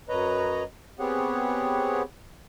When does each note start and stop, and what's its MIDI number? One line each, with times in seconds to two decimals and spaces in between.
0.09 0.63 42
0.09 0.63 71
0.09 0.63 73
0.09 0.63 75
0.09 0.63 82
1.00 2.02 59
1.00 2.02 60
1.00 2.02 67
1.00 2.02 68
1.00 2.02 73
1.00 2.02 78